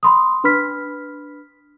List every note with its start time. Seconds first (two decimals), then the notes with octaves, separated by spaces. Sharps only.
0.03 B5 C6 D#6
0.44 D4 B4 B5 F6 B6